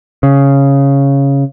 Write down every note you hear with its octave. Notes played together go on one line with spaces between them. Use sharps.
C#3